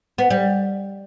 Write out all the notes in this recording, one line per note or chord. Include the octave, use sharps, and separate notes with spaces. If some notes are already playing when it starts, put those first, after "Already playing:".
B3
G3